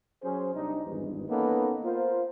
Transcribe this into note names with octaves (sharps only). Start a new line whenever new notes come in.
F#3 C#4 G#4 C5
C2 G3 D4 D#4
G#1 E2 G2
A#3 B3 C#4 D#4 A4 B4
F4 A#4 C5